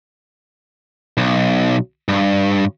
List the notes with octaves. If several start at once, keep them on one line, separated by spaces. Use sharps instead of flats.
B1
G2